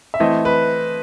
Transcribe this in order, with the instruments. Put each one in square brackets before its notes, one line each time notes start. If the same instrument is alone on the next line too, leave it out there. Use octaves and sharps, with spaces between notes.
[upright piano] E5
[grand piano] E3 A3 C4 E4 [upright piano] D#5
[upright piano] B4